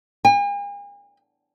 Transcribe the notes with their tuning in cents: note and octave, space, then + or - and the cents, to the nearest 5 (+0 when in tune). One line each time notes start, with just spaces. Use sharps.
G#5 -45